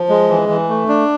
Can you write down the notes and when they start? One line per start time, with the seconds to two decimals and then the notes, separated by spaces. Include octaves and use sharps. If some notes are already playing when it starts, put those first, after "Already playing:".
Already playing: F3
0.09 G#3
0.29 E3
0.49 E3
0.69 A3
0.88 D4